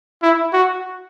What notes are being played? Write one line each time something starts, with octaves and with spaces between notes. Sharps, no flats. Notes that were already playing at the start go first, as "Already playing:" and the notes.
E4
F#4